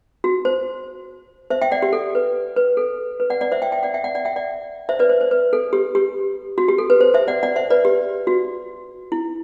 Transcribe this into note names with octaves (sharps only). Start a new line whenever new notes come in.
F#4
C5
C5 E5
E5 G5
D5 F#5
G4
A4
B4
B4
A4
B4
D5 F#5
D5 F#5
C5 E5
E5 G5
E5 G5
D5 F#5
E5 G5
D5 F#5
D5 F#5
E5 G5
D5 F#5
C5 E5
B4 D5
C5
C5
B4
A4
G4
G4
F#4
G4
A4
B4
C5
C5 E5
D5 F#5
D5 F#5
C5 E5
B4 D5
G4
F#4
E4